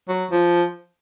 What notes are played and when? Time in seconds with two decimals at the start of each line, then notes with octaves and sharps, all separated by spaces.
0.09 F#3
0.31 F3